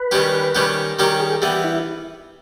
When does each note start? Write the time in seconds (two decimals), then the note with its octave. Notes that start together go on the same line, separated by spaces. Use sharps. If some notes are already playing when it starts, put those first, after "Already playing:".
Already playing: B4
0.11 D#3 G3 C#4 G4
0.55 D#3 G3 C#4 G4
0.99 D#3 G3 C#4 G4 A#4
1.20 G#4
1.42 E3 G3 B3 G4
1.64 E4